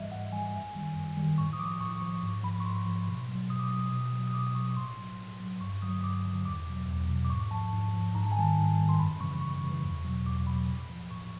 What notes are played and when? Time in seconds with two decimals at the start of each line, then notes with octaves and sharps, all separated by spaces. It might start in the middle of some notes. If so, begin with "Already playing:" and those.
Already playing: G#2 E3 G3 D#5 E5
0.11 G#2 F#5
0.32 E3 G3 G#5
0.54 F#2
0.75 D#3 G3
0.96 F#2
1.17 D#3 G3
1.38 A2 C#6
1.53 D#6
1.59 F3 D6
1.81 A2 C#6
2.02 F3 C#6
2.22 G#2
2.44 F3 B5
2.60 C#6
2.65 G#2 C6
2.86 F3
3.08 B2
3.29 F#3
3.50 B2 D#6
3.59 D6
3.69 F#3 D#6
3.92 B2
4.13 F#3
4.27 D#6
4.34 B2 D6
4.55 F#3 C#6
4.77 A2 C6
4.97 F#3
5.18 A2
5.40 F#3
5.61 G2 C#6
5.82 D3 F#3 D#6
6.03 G2 D6
6.25 D3 F#3
6.45 E2 D6
6.67 B2 F#3
6.88 E2
7.09 B2 F#3
7.25 D6
7.30 G#2 C#6
7.51 F3 A5
7.73 G#2
7.94 F3
8.15 G#2 A#5
8.23 A5
8.32 G#5
8.36 D#3 G3 A5
8.57 G#2
8.78 D#3 G3
8.89 C6
8.99 F#2 B5
9.21 C#3 E3 G3 C#6
9.41 F#2 C#6
9.63 C#3 E3 G3
9.84 E2
10.05 B2 F#3
10.26 E2 D6
10.47 B2 F#3 B5
10.68 A2
10.90 F3
11.11 A2 C#6